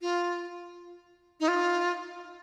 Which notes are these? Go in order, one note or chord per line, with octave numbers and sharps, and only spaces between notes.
F4
D#4
F4